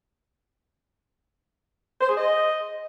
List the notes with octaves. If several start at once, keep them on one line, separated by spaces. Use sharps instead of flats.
C5
G#4
D#5